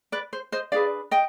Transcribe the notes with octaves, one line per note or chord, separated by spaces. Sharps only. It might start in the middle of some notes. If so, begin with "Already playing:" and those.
B4 D5
C5
C5 D#5
D4 G#4 B4 D5 F5
D#5 G5